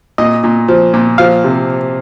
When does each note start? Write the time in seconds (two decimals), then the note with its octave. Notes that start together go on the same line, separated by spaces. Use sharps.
0.18 A#2 D#5
0.44 A#2
0.68 F3
0.94 A#2
1.18 F3 F5
1.44 C3